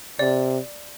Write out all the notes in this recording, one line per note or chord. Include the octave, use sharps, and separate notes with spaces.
C3 D5